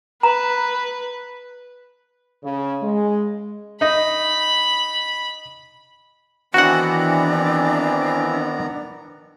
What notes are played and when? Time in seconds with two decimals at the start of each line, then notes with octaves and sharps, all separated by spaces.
0.23 B4 A#5
2.43 C#3
2.82 G#3
3.81 D#4 D#5 B5
6.54 D#3 E3 B3 C4 D4 F#4 F#5 A#5